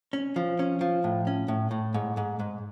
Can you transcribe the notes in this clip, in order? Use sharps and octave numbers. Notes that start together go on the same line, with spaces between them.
C#4
F3
C#4
F3
A2
C#4
A2
A2
G#2
G#2
G#2